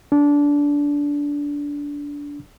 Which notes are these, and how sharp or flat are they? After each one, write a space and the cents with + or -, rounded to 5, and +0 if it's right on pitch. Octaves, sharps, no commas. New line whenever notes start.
D4 -20